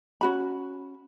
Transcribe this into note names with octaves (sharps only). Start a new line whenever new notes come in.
C#4 F#4 B5